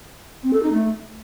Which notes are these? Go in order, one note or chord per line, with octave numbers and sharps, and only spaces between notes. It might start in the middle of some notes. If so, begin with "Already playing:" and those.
C4
A4
D#4
A3